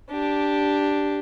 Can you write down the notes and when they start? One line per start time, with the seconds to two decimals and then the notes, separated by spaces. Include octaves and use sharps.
0.11 D4 G4